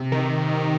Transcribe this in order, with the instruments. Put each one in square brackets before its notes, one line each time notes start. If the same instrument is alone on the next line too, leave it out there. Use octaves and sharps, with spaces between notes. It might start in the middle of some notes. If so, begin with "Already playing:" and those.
Already playing: [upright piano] C3
[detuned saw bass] D#3